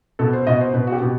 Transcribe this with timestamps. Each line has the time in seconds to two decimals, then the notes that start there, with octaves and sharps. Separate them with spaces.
0.19 B2 A4
0.33 C5
0.47 B2 D#5
0.61 C5
0.74 B2 B4
0.87 F#4
0.92 G4
1.01 B2